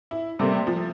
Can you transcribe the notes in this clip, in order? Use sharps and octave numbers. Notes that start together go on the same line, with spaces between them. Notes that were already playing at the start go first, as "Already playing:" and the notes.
E4
C3 G3 A3 A#3 C4
F3